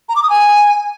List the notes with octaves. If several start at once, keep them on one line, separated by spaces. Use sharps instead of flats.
A#5
D6
D#6
G#5